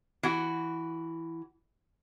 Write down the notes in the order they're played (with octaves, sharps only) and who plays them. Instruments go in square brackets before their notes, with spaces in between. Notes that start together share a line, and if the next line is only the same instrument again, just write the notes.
[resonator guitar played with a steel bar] E3 F#4